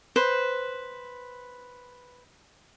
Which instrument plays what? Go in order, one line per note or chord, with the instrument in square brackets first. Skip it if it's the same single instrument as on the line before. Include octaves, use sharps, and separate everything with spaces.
[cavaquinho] B4 C5